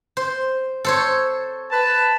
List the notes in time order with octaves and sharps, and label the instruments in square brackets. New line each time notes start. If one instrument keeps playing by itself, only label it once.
[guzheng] C5
A4 C5 C#5
[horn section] B4 A5